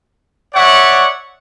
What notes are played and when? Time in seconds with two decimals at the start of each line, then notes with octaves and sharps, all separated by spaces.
0.54 C#5 D5 E5 F#5 C#6